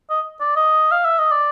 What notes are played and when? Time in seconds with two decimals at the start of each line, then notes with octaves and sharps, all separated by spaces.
0.10 D#5
0.40 D5
0.56 D#5
0.92 F5
1.05 E5
1.19 D#5
1.32 D5